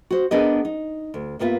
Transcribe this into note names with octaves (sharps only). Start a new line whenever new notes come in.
F#4 C5
B3 D4 G#4 A#4 B4 D#5
D#4
D2
G2 A#3 B3 F4 E5